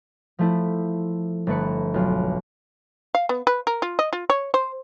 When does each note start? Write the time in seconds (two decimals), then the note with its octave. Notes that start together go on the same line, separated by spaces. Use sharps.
0.39 F3 A3 E4
1.47 G1 A3 B4 C#7
1.94 B1 F4
3.15 F5
3.29 B3
3.47 B4
3.67 A#4
3.82 F4
3.99 D#5
4.13 F4
4.30 C#5
4.54 C5